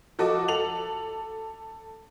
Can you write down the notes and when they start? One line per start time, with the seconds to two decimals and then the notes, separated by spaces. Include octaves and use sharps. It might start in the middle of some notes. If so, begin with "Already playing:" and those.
0.19 F3 F#4 A4 D#5 D6
0.48 A4 F7 F#7